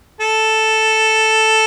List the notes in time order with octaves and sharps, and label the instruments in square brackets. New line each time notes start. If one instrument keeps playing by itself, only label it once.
[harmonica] A4